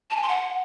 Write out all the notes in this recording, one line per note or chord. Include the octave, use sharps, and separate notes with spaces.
A5
G#5
C6
F#5